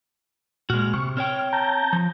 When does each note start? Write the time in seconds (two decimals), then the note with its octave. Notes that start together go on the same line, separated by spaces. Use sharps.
0.70 A#2 G#3 F#4 F6
0.94 C3 C#6
1.17 C4 C#5 G5 F6
1.53 A5 A#5 G6
1.93 F3